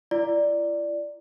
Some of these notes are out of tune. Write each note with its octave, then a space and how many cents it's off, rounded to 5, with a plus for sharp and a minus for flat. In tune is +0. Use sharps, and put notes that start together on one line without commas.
E4 +45 D5 +0